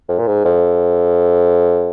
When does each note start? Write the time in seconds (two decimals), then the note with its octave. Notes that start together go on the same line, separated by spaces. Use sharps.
0.09 F2
0.19 A#2
0.27 G#2
0.45 F2